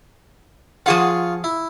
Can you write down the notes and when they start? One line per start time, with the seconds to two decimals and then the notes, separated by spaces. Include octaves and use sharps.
0.86 F3 F4 G#4 F5 F#5 C#6
1.44 E4